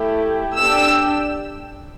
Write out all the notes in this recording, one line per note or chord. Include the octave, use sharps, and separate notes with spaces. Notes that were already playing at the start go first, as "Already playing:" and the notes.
Already playing: A3 E4 G4
D4 G4 E6